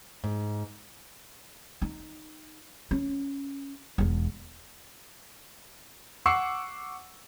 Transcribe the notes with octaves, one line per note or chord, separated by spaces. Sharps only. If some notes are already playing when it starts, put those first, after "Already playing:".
G#2
D#4
C#4
E1 E2
F#5 C#6 D6 E6 C7